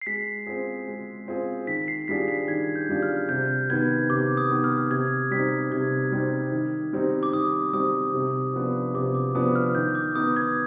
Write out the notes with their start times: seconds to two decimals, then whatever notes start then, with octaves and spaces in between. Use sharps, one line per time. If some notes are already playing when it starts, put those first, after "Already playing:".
0.02 C7
0.07 G#3 B6
0.47 C4 F4 G#4
0.88 G#3
1.28 C4 F4 G#4
1.67 D#3 B6
1.88 C7
2.08 G3 D4 F4 G#4 B6
2.28 B6
2.48 D#3 G#6
2.76 G6
2.89 G3 D4 F4 G#4
3.03 F6
3.29 C3 G6
3.70 D#3 B3 G#6
4.09 C3 D6
4.37 D#6
4.51 D#3 B3
4.64 F6
4.91 C3 G#6
5.31 G3 C4 D#4 B6
5.72 C3 G#6
6.12 G3 C4 D#4
6.52 D#3
6.93 G3 C4 D#4
7.23 D6
7.32 D#3 D#6
7.73 G3 C4 D#4 D#6
8.14 C3
8.54 F3 B3 D4
8.94 C3 D6
9.14 D6
9.35 F3 B3 D4 D#6
9.55 F6
9.75 D#3 G6
9.95 D6
10.15 B3 D#4 D#6
10.36 G#6